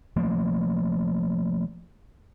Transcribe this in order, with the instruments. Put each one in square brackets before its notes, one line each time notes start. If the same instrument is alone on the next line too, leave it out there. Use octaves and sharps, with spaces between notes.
[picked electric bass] F3 A3 A#3